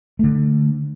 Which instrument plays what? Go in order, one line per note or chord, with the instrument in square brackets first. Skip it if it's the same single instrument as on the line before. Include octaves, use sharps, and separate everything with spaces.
[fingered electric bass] D3 A3